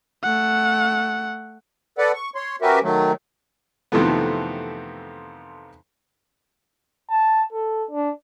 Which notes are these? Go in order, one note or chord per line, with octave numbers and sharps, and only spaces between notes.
A3 F#5
A4 B4 D5 F#5
C#6
C#5 C6
C#4 F#4 G4 A#4 B4 E5
D#3 F#3 A3
F2 C3 D#3 E3 A3 B3
A5
A4
D4